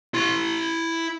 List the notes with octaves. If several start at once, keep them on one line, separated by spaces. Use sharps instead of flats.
E4 C6